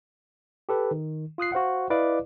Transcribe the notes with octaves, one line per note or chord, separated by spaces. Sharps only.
G4 A4 B4
D#3
F4 D#6 F#6 C7
F#4 C5 F5 F#5
E4 B4 D5 D#5 F5 D6